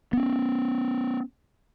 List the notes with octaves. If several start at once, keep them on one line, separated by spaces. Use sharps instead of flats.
B3 C#4